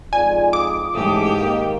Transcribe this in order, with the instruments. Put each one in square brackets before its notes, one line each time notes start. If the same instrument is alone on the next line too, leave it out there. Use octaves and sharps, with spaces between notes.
[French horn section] F2 G#2 F4 [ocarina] D5 [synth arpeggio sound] G#5
[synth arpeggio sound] D6 [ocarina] D#6
[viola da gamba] G#2 G4 [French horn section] C#3 E3 A3 [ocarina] D#6
[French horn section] D#3 A#3 [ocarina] F5